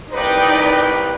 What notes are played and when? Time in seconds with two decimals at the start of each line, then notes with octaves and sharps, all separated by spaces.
0.13 C2 D#4 B4 D5 G5